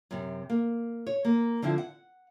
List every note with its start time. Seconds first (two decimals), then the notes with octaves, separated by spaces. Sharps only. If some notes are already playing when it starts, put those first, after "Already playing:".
0.11 F#2 C3
0.50 A#3
1.07 C#5
1.25 A#3
1.62 D3 F3 C4 E4
1.78 F#5